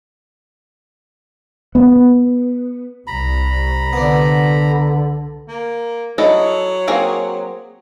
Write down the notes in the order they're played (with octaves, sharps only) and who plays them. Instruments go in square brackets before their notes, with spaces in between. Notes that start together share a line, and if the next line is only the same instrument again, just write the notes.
[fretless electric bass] B3
[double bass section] C2 [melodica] A#5 B5
[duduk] D3 [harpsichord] B3 D4
[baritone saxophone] A#3
[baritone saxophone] F#3 [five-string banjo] E4 A4 D#5
[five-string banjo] A#3 C4 G#4